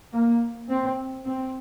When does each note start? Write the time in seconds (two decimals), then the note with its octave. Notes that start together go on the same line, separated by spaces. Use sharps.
0.13 A#3
0.69 C4
1.25 C4